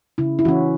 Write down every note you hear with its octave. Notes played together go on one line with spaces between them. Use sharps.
C#3 E4
E4
E3 C#4 F#4